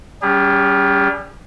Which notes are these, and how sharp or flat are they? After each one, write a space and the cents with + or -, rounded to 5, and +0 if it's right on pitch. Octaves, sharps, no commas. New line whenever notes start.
G3 -20 C#4 +25 G#4 -45